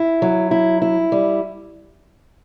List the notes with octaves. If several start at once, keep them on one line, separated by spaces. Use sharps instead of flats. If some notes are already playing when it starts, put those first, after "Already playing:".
Already playing: E4
F#3
E4
E4
G3